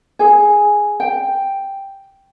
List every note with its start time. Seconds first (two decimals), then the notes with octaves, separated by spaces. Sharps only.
0.19 G#4 G#5
1.00 G5